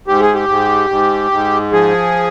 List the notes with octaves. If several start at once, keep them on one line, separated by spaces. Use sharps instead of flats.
G#2 G4
G#4
G4
G#2
G#2
G#2
F3 G#4